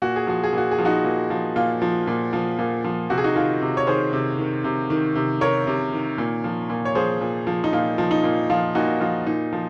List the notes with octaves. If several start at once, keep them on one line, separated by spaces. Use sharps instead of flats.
A#2 F#4
G#4
F3 F#4
G#4
A#2 F#4
G#4
F3
D#4 F#4
A#2
F3
A#2 F4
F3
A#2
F3
A#2
F3
C3 F#4
G#4
D#4 F#4
D#3 F4 G#4
C3
C#5
D#3 G#4 C5
C3
D#3
C3
D#3
C3
D#3 A#4 C#5
C3
D#3
A#2
F3
A#2
C#5
F3 G#4 C5
A#2
F3
D#4
A#2 F4
F3
D#4
A#2
F3 F4
A#2 D#4 F#4
F3 F4
A#2 D#4
F3